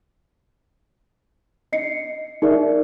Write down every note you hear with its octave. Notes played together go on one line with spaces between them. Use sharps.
D#5 C7 C#7
D#4 G#4 A#4 D5 E5